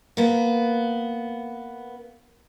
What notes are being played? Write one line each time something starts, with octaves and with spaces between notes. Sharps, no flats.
A#3 B3